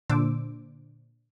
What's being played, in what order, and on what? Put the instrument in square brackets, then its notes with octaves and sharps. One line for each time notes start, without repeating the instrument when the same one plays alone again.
[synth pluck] A#2 D3 D4 C5 D6 E6